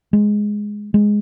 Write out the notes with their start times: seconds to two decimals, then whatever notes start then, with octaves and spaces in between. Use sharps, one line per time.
0.13 G#3
0.94 G#3